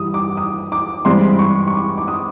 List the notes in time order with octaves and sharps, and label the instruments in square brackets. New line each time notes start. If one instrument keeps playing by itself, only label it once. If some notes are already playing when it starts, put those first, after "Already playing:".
Already playing: [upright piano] G2 E3 G3 [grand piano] D#6
[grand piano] D6
D#6
D6
[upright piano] G2 E3 G#3 C4 [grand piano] C6
[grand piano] C#6
C#6
D6
D6
D#6